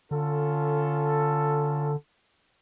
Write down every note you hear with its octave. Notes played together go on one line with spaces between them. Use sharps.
D3 C#4 F4 A4